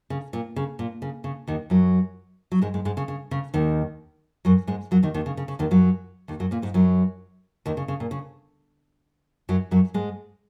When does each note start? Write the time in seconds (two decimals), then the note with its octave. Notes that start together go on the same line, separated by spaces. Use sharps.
0.10 C#3
0.33 A#2
0.56 C#3
0.79 A#2
1.02 C#3
1.24 C#3
1.47 D#2 D#3
1.70 F#2 F#3
2.52 F#3
2.62 G#2 G#3
2.74 G#2 G#3
2.85 G#2 G#3
2.97 C#3
3.08 C#3
3.31 C#3
3.54 D#2 D#3
4.45 F#2 F#3
4.67 G#2 G#3
4.91 F#2 F#3
5.03 D#2 D#3
5.14 D#2 D#3
5.26 C#3
5.37 C#3
5.48 C#3
5.59 D#2 D#3
5.71 F#2 F#3
6.28 D#2 D#3
6.40 F#2 F#3
6.51 A#2 A#3
6.62 G#2 G#3
6.74 F#2 F#3
7.66 D#2 D#3
7.77 C#3
7.88 C#3
8.00 A#2
8.11 C#3
9.49 F#2 F#3
9.71 F#2 F#3
9.94 G#2 G#3